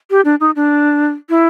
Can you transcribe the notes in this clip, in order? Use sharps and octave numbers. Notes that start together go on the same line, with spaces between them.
G4
D4
D#4
D4
E4